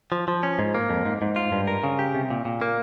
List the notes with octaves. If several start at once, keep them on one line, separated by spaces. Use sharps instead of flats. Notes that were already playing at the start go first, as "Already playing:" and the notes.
F3
F3
C#4
G#2
A#3
F2
G#2
G#2
F4
G2
A#4
C#3
G4
C3
A#2
A#2
A#3